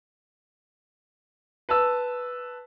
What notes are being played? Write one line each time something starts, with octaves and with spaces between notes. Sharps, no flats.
B4 A5 E6